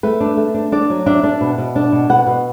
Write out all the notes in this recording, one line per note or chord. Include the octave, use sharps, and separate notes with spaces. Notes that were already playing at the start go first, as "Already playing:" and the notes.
A3 B4
D4
A3
D4
D4 D5
F#3
D4 E5
D4
B2
B2
D4
B2
B2 F#5
B2